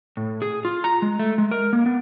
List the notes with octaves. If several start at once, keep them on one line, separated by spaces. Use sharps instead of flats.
A2
G#4
F4
A#5
G#3
A3
G#3
A#4
A#3
B3